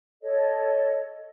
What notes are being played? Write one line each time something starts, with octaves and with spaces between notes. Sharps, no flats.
A4 C#5 D#5